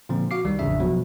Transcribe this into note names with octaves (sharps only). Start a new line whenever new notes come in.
A#2 D3 F3 C4
F#4 F5 D6 C7
C2 D#3 G3
A1 F2 C#3 D4 E5
B2 F3 F#3